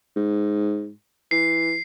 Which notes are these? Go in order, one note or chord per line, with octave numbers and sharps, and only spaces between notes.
G#2
E3 C7